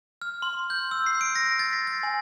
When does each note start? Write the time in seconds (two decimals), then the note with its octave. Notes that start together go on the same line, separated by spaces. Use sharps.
0.22 F6
0.42 C6
0.70 G6
0.91 E6
1.06 C7
1.21 D7
1.35 A#6
1.59 A6
1.73 B6
1.87 A6
2.03 G#5